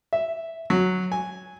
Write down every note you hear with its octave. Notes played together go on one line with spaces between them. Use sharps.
E5
F#3
G#5